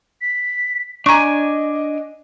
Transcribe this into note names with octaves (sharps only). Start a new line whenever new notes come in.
B6
D4 D#5 G#5 A#5 C#6